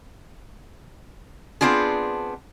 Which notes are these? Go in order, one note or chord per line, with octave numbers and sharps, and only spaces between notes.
B3 C4 D4 F4 G#4